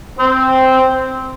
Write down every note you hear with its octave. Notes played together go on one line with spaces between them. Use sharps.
C4